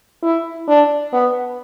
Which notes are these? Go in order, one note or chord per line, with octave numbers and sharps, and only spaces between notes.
E4
D4
B3